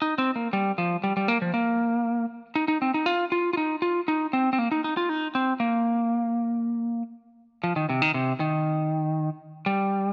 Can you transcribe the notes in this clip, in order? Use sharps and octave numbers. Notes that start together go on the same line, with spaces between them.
D#4
C4
A#3
G3
F3
G3
G3
A#3
F3
A#3
D#4
D#4
C4
D#4
F4
F4
F4
D#4
F4
D#4
C4
C4
A#3
D#4
D#4
F4
D#4
C4
A#3
F3
D#3
C3
D#3
C3
D#3
G3